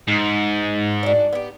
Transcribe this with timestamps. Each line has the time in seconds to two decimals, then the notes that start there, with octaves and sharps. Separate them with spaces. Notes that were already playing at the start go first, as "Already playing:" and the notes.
0.08 G#2
1.03 D4 F#4
1.33 B3 G4